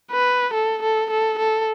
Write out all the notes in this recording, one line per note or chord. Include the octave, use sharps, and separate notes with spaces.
B4
A4
A4
A4
A4